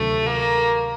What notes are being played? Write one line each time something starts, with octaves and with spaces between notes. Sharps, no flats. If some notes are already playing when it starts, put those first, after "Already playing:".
Already playing: D2 C3 D#3 F#3 A3
A#3